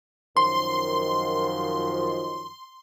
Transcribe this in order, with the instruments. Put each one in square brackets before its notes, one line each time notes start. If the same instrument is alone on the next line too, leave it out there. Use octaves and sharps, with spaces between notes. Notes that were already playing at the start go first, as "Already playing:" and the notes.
[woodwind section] F#2 D#3 F3 [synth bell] C6